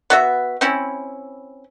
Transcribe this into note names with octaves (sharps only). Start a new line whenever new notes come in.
B3 F#4 E5
C4 C#4 E4